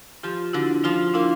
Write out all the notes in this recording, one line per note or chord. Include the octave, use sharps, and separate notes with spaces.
F3 F4 G4
D3 E4 F#4
F3 D#4 F4
A#3 D4 E4